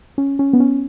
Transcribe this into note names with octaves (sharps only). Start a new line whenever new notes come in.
C#4
C#4
B3
C#4